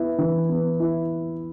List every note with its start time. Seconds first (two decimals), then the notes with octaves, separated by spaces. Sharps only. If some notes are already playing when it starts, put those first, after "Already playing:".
Already playing: B3 E4
0.18 E3
0.49 B3
0.80 E4